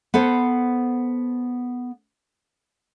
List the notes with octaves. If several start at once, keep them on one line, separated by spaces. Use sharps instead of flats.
B3 A4 C5 F#5